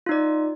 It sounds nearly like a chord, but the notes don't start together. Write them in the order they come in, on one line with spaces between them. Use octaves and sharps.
F4 D#4 D5